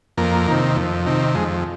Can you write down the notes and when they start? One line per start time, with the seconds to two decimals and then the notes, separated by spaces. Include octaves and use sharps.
0.17 F2 A#3
0.48 C3 D#3
0.77 F2
1.06 C3 D#3
1.35 F2 G#3